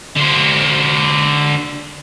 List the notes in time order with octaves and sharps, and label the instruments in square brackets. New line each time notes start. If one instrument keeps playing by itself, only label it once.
[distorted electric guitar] D3 C5